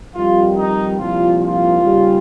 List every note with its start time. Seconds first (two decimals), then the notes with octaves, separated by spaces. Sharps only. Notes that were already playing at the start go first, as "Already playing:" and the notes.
0.13 F2 D#3 G3 F4
0.56 D#4
0.98 C2 A#2 F3 F4
1.40 F4
1.82 D#2 C#3 G3